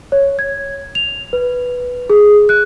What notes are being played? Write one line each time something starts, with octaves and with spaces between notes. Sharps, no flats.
C#5
G#6
F7
B4
G#4
F#6